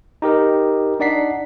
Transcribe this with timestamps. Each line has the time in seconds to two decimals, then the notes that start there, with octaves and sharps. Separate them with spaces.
0.22 D#4 G4 A#4
1.00 D4 D#4 D5 F#5 B6 C7